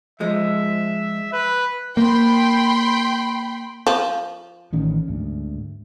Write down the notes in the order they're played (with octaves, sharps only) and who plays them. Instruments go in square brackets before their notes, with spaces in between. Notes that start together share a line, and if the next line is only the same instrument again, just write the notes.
[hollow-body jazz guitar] F3 G#3 [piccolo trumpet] E5
[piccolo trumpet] B4
[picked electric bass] A#3 [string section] G5 B5 C6
[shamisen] F3
[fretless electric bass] A1 D#3 C#4
D2 G#2